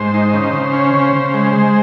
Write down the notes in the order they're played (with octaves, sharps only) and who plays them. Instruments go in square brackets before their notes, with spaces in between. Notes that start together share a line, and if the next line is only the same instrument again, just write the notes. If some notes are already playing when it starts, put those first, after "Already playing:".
Already playing: [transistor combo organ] G#2 C5
D#4
C#3
C#3
C#4
C#3
C#3
G#3
G#3